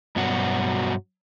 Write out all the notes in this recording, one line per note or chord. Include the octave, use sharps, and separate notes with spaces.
G2 B2 F#3 F#4